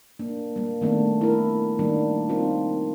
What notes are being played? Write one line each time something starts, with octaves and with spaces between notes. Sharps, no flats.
A#3 D4
G3 A#3
D#3 A3 B3 D4
E4 A#4
D#3 G3 A#3 D4 D#4
C4 D#4 F4 A#4